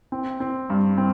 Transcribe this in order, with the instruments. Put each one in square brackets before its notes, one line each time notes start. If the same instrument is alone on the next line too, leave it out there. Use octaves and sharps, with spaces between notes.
[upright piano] C4
C4
G2
C4